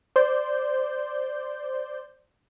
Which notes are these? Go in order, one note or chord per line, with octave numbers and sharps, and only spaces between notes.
C5 D5 G6